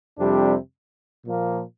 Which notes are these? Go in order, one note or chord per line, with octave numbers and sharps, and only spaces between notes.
F2 C3 G3 D4
A#2 F3 A#3